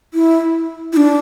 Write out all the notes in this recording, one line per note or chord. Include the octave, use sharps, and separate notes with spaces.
E4
E4
D4